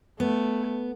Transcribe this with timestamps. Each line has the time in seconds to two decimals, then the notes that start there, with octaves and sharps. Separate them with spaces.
0.20 A3 B3